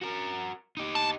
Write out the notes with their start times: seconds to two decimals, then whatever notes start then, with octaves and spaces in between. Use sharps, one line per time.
0.01 F#4 A#4
0.77 D#4 G4
0.95 A5